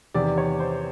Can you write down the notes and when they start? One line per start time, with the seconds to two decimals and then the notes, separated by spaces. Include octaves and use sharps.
0.14 E2 C3 D#3 D5
0.38 C#5
0.60 C5